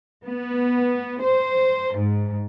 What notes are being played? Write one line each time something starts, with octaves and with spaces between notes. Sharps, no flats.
B3
C5
G#2